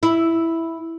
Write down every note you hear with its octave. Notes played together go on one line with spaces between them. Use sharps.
E4